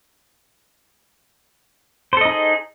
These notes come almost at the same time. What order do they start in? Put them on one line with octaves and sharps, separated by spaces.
C5 A4 D#5 D#4 G#4